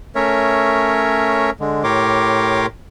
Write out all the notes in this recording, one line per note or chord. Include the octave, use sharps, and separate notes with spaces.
A3 C#4 A#4 C#5 E5
D3 G#3
A2 G4 A#4 C#5 C6 D6